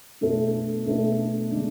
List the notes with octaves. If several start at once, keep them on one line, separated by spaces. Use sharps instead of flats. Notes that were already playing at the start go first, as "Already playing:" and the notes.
B2 A3 D4 A4
B2 A3 D4 A4
D3 G#3 D4